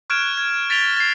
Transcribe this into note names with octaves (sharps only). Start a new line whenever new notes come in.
C#6 F6 F#6 G#6 D7 E7
G#6
A6 B6 D7 F7 G7
A6 C7